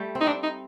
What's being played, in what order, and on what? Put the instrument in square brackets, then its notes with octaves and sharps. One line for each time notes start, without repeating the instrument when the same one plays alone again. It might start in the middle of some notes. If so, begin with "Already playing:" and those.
Already playing: [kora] G3 A3
C4
[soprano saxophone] D#4
[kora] C4 [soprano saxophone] D4
[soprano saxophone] D#4